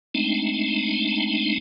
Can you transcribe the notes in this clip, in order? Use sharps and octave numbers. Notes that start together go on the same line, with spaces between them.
G#3 A3 C4 D4 D#4